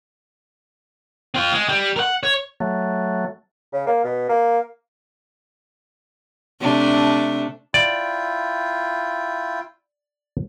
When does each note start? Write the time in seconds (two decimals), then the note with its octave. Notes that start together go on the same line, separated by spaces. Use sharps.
1.35 C4 F4
1.52 G#3
1.69 G3
1.96 A#4 F#5
2.23 C#5
2.60 F#3 A3
3.73 C#3
3.87 A#3
4.04 B2
4.29 A#3
6.61 C3 A3 D4
7.74 E4 F4 D5 G5